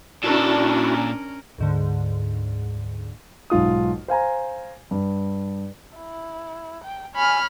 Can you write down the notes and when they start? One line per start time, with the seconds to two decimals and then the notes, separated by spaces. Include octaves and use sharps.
0.24 A#2 C#4 D4 E4 F#4 A4 A#4
1.58 D2 G#2 D3
3.50 B1 G#2 F4 D#6
4.08 C5 F5 G#5 A#5
4.91 G2
5.97 E4
6.84 G5
7.15 C#5 G#5 B5 F6